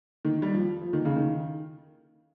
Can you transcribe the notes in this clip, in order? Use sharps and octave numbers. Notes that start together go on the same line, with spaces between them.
D#3
G3
F3
F3
D#3
C#3
D#3